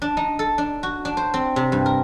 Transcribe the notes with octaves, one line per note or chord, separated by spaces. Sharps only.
D4
D#4
A4
D4
F#4
D4
C5
C4
C3
G2
A#4